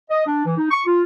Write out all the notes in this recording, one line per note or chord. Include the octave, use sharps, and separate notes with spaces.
D#5
D4
E3
D#4
C#6
F4